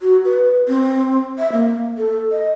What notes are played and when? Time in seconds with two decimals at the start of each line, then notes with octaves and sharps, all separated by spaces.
0.01 F#4
0.25 B4
0.68 C4
1.38 E5
1.52 A#3
1.98 A4
2.32 D#5